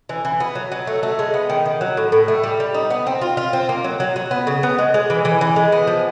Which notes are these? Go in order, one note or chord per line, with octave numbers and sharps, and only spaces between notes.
E3
E3
B3
F#3
F#3
A3
A3
G#3
B3
D#3
D#3
F#3
A2
A2
A3
G3
G3
D#4
B3
C4
F4
F4
C4
A#3
F#3
F#3
F#3
B3
C#3
B3
G#3
G#3
E3
E3
E3
G#3
B3
F3